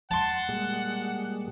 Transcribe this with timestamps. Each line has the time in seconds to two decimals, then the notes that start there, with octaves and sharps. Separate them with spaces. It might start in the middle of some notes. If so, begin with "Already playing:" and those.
0.11 F#5 A5 C6
0.49 A#2 G3 G#3